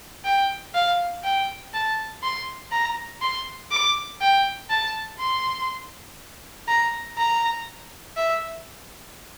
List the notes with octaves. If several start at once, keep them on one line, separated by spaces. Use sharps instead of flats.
G5
F5
G5
A5
C6
A#5
C6
D6
G5
A5
C6
A#5
A#5
E5